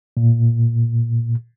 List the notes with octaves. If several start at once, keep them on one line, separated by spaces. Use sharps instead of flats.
A#2